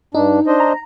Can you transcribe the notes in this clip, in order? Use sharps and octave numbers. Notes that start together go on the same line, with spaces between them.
G2 D4 D#4
D4 C5 D#5
A#5